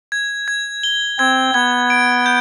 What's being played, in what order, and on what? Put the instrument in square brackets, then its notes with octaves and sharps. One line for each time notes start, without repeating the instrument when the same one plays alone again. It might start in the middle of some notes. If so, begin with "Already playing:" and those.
[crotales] G#6
G#6
G7
[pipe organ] C4 [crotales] G#6
[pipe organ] B3 [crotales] G#6
[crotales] D7
G6